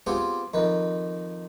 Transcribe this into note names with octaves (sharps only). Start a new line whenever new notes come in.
B3 C4 F4 G4 G#4
F2 D#3 B4